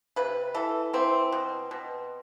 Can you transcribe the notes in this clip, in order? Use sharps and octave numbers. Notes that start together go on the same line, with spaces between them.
C3 B4
E3 A4
E3 C4
B2
B2